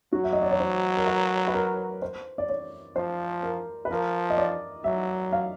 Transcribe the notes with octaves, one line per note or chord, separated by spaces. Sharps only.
F#3 F#4
E5
D#5
D5
C#5
C5
A#4
B4
B4
A#4
C5
D5
C#5
F3 C5
A#4
B4
F3 A#4
D#5
D5
F#3 E5
F5